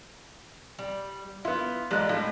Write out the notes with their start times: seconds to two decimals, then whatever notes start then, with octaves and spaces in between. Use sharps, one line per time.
0.79 G3
1.45 B3 E4 F4
1.91 A1 G3 G#3 F#6
2.09 A2 G#3 A#3